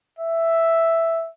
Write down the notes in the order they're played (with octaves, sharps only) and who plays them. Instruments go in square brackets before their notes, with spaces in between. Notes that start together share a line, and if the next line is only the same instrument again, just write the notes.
[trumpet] E5